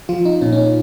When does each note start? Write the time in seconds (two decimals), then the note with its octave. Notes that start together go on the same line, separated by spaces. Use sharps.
0.09 F3 F4
0.25 D#4
0.41 A#2 C#4
0.52 C#4
0.58 D#4